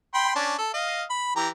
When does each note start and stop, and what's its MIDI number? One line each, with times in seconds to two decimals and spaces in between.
0.14 0.35 79
0.14 0.35 83
0.14 0.35 84
0.35 0.55 61
0.35 0.55 62
0.58 0.70 69
0.74 1.03 75
0.74 1.03 77
1.10 1.31 83
1.36 1.48 52
1.36 1.48 67
1.36 1.48 82